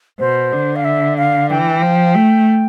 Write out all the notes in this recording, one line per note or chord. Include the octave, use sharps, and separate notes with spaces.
B2 C5
D3
F5
E5
F5
E3 G5
F3
A3